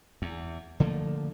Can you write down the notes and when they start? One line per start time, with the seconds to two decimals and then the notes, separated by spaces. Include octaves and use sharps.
0.22 E2
0.80 D3 F3 A3 A#3